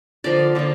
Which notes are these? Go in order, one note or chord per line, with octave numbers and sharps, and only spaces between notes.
D3 F3 A#3 D5
D3 F3 A#3